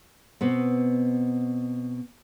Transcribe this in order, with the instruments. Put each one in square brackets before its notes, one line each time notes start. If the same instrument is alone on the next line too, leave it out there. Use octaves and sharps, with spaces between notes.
[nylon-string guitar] B2 B3 C4